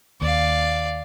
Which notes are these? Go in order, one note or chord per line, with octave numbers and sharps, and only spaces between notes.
D#2 D5 F5